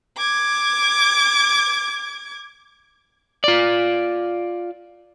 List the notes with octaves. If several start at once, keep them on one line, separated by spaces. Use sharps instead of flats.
D6 G#6
F4 D5